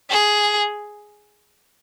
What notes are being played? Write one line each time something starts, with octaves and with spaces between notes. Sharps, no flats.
G#4